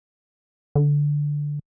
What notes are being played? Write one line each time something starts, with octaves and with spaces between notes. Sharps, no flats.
D3